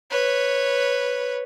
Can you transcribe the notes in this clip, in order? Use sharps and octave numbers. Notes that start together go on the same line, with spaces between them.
B4 C#5